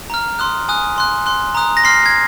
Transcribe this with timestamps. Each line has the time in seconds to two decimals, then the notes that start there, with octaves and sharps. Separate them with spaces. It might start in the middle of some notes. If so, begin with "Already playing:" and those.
0.10 A#5 F6
0.39 C6 D#6 F#6
0.69 G#5 D#6 F#6
0.98 C6 F#6
1.26 C6 F#6
1.55 A#5 D#6 F#6
1.77 A#6
1.84 C6 F6 C7
2.06 G#6